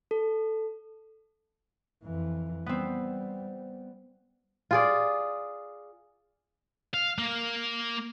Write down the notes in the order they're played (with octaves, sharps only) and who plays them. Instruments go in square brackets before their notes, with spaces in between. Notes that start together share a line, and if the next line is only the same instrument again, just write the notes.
[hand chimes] A4
[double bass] F2 E3
[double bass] G3 [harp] B3 C4
[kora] F4 G#4 D5
[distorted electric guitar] F5
A#3